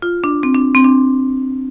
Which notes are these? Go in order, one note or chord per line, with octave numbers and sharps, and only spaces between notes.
F4
D4
C4
D4
C4
D4